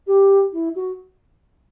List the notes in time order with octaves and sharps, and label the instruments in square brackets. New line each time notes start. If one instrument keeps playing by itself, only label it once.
[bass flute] G4
E4
F#4